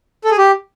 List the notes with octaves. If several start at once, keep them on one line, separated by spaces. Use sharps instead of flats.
A4
G#4
G4